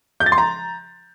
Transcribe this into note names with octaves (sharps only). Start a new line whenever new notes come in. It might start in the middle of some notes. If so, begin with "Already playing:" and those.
G6
A6
C6
A#5